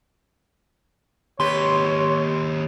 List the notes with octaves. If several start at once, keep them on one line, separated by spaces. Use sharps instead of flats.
D#2 G4 B4 C#5 C6